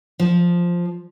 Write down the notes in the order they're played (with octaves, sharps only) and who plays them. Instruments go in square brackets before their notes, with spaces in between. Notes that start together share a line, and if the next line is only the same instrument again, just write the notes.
[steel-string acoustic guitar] F3